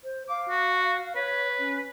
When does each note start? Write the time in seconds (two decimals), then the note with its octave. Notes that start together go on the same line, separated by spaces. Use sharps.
0.04 C5
0.29 F5 D6
0.49 F#4
1.16 B4 C#5
1.59 C#4